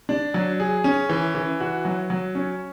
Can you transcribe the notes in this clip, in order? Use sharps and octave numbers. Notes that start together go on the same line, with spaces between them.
D4
F#3
G#4
C#4
E3
E3
F#4
F#3
F#3
C#4